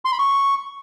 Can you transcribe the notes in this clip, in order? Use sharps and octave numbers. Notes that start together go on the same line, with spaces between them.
C6
B5
C#6